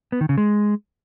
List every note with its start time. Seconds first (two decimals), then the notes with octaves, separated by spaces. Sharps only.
0.12 B3
0.21 D#3
0.29 C#3
0.38 G#3